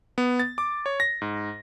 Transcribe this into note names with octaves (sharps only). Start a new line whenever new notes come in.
B3
A6
D6
C#5
A#6
G#2